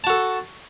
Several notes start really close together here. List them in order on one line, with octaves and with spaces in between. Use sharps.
A5 F#4 A4